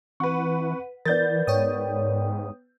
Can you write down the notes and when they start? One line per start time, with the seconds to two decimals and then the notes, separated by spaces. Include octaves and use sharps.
0.20 E3 C4 B4 F#5 C#6
1.05 E3 B3 A#4 D5 G6 A6
1.47 G#2 C#5 G5 D#6